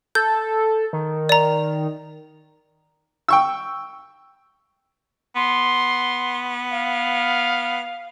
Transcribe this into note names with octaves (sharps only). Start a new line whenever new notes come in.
A4 G6
D#3
D5 A#5
G5 C#6 E6
B3 C6
F5